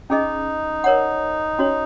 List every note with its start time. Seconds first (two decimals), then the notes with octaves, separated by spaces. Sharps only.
0.10 C#4 D#4 G#4 D#5
0.84 A#4 C#5 F#5
1.59 C#4 F#4 C#5